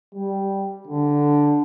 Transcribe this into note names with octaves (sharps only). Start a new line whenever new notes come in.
G3
D3